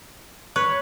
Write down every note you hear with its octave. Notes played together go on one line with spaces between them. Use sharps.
B4 C#5